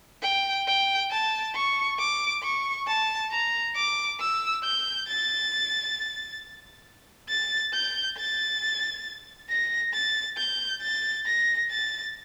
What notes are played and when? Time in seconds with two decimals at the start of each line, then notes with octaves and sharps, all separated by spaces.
0.23 G5
0.67 G5
1.11 A5
1.55 C#6
1.99 D6
2.43 C#6
2.87 A5
3.31 A#5
3.76 D6
4.20 E6
4.63 G6
5.08 A6
7.29 A6
7.73 G6
8.18 A6
9.49 A#6
9.94 A6
10.37 G6
10.82 A6
11.26 A#6
11.70 A6